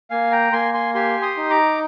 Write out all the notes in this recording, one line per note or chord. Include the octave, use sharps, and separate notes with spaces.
A#3 F5 G#5
G5 A#5
A#3 G#5 C6
G#5 C6
G4 G#5 C6
C6 D#6
D#4
A#5 D6